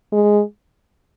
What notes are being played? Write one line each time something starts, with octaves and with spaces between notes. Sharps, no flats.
G#3